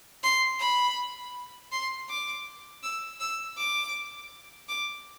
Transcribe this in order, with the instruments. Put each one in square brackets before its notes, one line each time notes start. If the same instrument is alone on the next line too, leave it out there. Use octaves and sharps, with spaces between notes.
[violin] C6
B5
C6
D6
E6
E6
D6
D6